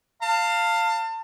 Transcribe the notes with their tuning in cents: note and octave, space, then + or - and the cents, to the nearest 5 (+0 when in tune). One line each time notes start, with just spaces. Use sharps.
F5 +0 A5 +35